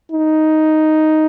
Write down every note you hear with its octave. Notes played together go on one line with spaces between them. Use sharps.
D#4